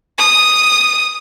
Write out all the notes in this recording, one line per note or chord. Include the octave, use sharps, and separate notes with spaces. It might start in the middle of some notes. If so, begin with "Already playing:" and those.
D#6